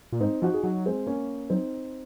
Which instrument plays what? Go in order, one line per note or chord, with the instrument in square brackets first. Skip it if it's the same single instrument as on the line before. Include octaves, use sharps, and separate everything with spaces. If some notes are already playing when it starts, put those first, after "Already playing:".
[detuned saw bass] A#2
[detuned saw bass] G#2 [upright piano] C4 D#4
[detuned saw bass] F3 [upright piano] D#4 F#4
[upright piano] G#4
[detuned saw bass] F#3 [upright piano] D#4 F#4
[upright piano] G#3 C4
A#3 C#4
[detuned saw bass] F#3 [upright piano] C4 D#4